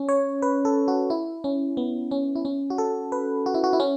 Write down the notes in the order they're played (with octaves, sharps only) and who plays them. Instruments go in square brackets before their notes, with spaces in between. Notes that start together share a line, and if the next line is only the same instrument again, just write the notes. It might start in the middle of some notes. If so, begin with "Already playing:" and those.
Already playing: [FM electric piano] C#4
C#5
B4
A4
F#4
E4
C#4
B3
C#4
E4
C#4
F#4
A4
B4
F#4
E4
F#4
E4
C#4